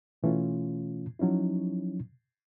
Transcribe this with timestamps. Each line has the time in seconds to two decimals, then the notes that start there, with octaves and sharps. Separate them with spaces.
0.23 B2 E3 A3 C#4 F4
1.19 F3 F#3 C#4 D#4 E4